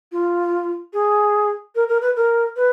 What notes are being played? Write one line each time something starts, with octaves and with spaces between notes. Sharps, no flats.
F4
G#4
A#4
A#4
B4
A#4
B4